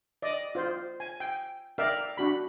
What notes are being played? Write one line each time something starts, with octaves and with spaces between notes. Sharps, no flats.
D5 D#5
F4 C5
G#5
G5
A#4 D5 E5 F5 G5
D4 F#4 B5